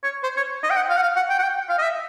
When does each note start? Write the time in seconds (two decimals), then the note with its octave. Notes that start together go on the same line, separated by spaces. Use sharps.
0.03 C#5
0.23 C5
0.37 C#5
0.63 D#5
0.70 G5
0.76 F#5
0.89 F5
0.97 F#5
1.02 F5
1.16 F#5
1.29 G5
1.39 F#5
1.43 G5
1.69 F5
1.78 D#5
1.82 E5